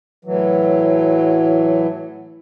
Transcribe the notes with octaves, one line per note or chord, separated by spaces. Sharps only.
A2 E3 F#3